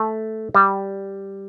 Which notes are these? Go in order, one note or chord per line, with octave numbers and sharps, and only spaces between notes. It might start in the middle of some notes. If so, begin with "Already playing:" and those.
Already playing: A3
G3